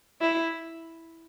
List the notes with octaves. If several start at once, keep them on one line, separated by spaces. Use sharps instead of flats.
E4